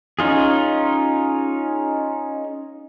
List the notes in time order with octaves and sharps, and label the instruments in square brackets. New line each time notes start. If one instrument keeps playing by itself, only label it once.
[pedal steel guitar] C#4 D#4 F4 G#4